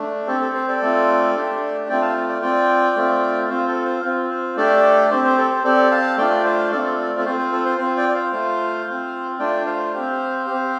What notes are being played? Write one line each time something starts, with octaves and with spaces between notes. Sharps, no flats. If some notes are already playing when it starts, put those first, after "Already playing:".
Already playing: A3 D4
C4 G4 A4
A4
C5
A4 D5
A3 C4 F4
A3 D4 G4
A3 C4 F4 D5 G5
F5 A5
D5 G5
C4 F4 D5 G5
A3 C4 F4
C4 F4 C5
A4
C5
C4 F4
C5
A3 D4 G4 A4 D5
C4 G4 C5
C5
A4
C5
C4 G4 A4 D5
F5 A5
A3 D4 F4 D5 G5
C5 F5
A3 C4 F4 A4 D5
A4
C4 F4 C5
C5
A4
C5
C4 F4 C5
D5 G5
D5
C5 F5
A3 F4
C4 F4
A3 D4 F4 D5 G5
C5 F5
C4 G4
C4 G4